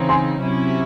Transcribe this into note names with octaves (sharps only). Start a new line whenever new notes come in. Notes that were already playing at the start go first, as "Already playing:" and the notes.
Already playing: C#3 E3 C4 D#4
G#5 C6
C3 F#3 C#4 E4